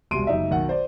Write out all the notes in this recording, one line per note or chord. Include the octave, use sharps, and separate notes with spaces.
E1 C2 C6 D7 D#7
F#1 D#4 E5
B1 D#3 F#5
C5 D5